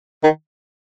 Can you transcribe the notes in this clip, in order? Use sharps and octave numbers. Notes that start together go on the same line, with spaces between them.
D#3